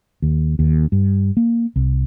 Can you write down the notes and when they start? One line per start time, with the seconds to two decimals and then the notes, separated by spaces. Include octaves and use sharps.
0.22 D#2
0.59 D#2
0.92 G2
1.37 A#3
1.76 C2